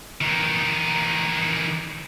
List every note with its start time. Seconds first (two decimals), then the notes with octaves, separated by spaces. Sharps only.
0.21 D#3 E3